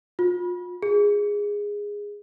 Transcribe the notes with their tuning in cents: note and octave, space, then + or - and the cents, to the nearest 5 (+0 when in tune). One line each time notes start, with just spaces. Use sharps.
F4 +35
G#4 -10